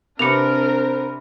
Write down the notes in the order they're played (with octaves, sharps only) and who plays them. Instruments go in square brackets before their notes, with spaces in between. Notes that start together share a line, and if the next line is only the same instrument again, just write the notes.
[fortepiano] C3 B4 D6 [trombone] C4 [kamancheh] D4 A#4 [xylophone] C#7 F7